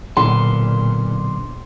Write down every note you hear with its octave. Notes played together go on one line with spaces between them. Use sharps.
B1 A#2 D3 C6